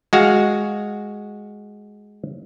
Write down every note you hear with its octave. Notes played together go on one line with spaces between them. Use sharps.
G#3 F#4 F5